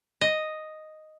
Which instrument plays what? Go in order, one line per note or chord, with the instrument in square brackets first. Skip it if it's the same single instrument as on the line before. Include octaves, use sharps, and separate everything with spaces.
[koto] D#5